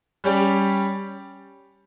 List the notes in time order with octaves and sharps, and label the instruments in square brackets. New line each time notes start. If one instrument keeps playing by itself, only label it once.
[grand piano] G3 C#4 G4 D5